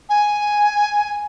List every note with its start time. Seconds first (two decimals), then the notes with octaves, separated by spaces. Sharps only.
0.09 G#5